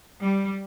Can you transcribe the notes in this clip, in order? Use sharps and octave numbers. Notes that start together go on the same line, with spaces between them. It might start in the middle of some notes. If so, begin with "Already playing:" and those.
G3